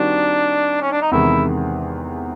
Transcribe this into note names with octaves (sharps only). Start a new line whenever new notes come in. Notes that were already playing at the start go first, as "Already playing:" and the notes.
Already playing: D#3 G3 C4 D4 D#4 F#4
C#4
D4
D#4
E2 C3 D#3 G#3 E4